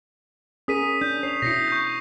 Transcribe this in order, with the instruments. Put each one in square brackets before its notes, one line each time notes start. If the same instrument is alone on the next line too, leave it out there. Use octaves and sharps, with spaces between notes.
[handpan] C#4 G#4 A#4 [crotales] D#6 B6 D#7
[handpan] D4 [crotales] G6
[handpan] C#5 [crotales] C7 F7
[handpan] B2 E4 [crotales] A#6 C7 C#7
[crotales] C#6 G6